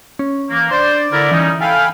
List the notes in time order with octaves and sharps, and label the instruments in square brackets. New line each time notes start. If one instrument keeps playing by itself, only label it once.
[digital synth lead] C#4
[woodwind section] E3 A#3
[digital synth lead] D4 [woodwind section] C5 [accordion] D5
[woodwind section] D3 E4 A#4
[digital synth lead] E3 [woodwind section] G3 C#4 D#4
[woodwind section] A4 F5 [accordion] G5 G#5 B5